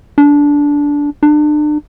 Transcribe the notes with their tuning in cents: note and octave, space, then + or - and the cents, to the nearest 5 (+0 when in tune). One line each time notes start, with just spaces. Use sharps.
D4 -15
D4 +35